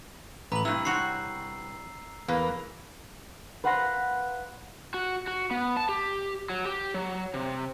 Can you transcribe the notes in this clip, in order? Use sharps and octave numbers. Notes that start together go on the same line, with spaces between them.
A1 B4 A#5 F#7
G2 C3 E4 E6
C4 F#4 C#5 C7
E2 A#3 B4
B4 F5 F#5 B5 C6 A#6
F#4
F#4
B3
A5
G4
F#3
G4
F#3
C3